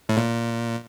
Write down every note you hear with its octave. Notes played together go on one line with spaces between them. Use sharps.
A2
A#2